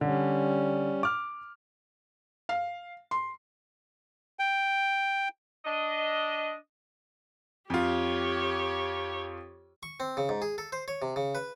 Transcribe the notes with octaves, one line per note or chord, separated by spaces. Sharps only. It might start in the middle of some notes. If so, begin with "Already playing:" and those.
D3 G3 C#4
D6 F6
F5
C6
G5
D4 D#5
F2 F4 G4 C#5
C#6
C4
C#3
G#2
G#4
A4
C5
C#5
C3
C#3
B4